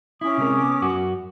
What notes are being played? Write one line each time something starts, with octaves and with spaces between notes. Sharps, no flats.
C#4 E4 D6 D#6
C3 G#3 A#4
B3
F#2 F#4